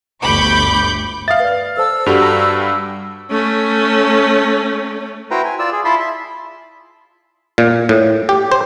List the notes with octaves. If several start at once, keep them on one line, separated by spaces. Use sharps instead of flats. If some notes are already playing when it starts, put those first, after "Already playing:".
G1 D2 B5 C#6 D6 G6
E5 F5 D#6 A6
B4 D5
A4 C5 A5 E6
G2 G3 F#4 A4 F7
A5 A#5 A#6
A3 C#4
E4 F#4 B4 C5 G5 A#5
G#5
F4 D5 E6
G#4
E4 F4 A5 B5 C6
E5
A#2
A2
G4
C5